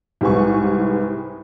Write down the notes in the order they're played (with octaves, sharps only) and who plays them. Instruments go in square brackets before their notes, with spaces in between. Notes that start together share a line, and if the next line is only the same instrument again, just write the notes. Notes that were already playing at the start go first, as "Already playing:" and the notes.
[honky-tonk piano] C2 G#2 G4 B4 G#5 C#6